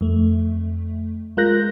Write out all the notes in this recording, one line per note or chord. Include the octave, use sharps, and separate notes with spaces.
F2 A3
G#3 F4 A#4 F#6 G6 A#6